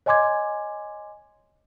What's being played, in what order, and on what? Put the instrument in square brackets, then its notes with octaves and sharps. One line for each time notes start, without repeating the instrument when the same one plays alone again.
[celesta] C#5 D#5 G#5 C6 D6 G#6